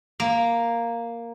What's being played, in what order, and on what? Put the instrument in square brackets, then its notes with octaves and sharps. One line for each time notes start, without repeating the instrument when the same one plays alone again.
[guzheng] A#3